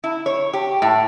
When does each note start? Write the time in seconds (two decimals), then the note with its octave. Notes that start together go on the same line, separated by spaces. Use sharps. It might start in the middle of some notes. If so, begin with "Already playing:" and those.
0.04 E4
0.26 C#5
0.53 G4
0.82 A2